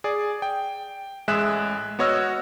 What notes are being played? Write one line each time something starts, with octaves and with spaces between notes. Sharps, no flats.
G#4 D5
G5
A1 G#3 G#4 E5 F#6 E7
B3 F#4 C#5 D#5 E6 F6